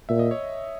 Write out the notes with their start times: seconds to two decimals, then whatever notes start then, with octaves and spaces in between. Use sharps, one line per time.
0.09 A#2 E5
0.19 D#5
0.31 C#5